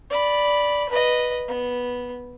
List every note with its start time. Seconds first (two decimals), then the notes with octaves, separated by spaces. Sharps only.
0.10 D5 B5
0.89 B4 D#5
1.48 B3